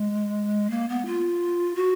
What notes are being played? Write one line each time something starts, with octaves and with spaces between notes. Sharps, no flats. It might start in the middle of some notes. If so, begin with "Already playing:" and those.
Already playing: G#3
A#3
B3
F4
F#4